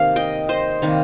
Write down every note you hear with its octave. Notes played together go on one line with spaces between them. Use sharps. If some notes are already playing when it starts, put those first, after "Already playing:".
Already playing: C3 D#3 A#3 F5
D#5 G5
C5 D#5
C3 D#3 G3 A#3